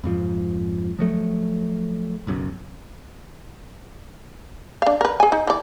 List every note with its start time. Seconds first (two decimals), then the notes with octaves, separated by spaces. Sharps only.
0.04 F2 G#2 F3
0.99 F3 F#3 A3
2.27 F#1 B1 F#2
4.82 D4 F5
5.01 A#4 B4
5.20 G#4 G#5
5.32 D#4
5.47 E3 D5